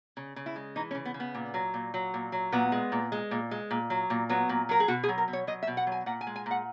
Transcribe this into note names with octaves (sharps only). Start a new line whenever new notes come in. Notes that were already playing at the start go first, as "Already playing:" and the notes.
C#3
C#3
E4
G#3
E3 D#4
C#4
C#3
B3
C#3
B3
A#2
F#3
A#2
F#3
A#2
F#3
A#2 B3
G#3
A#2
G#3
A#2
G#3
A#2
F#3
A#2
F#3 B3
A#2
F#3 A#4
G#4
B2 F#4
G#4
F#3
A#4
B2
C#5
F#3 D#5
E5
B2
F#5
F#3 G#5
A#2 F#5
G#5
G#3
G#5
A#2 F#5